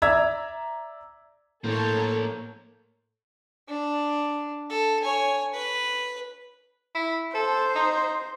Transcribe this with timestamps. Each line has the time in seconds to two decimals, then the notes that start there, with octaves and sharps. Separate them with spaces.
0.02 D5 E5 A#5 E6 G#6
1.64 A2 A#3 A4 C5 C#5
3.69 D4
4.70 A4
5.02 C#5 G#5
5.54 B4
6.95 E4
7.35 A4 C5
7.75 D#4